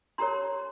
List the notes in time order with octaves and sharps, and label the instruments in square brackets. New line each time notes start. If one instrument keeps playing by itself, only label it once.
[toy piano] D4 G4 A#4 C#5 A#5 C6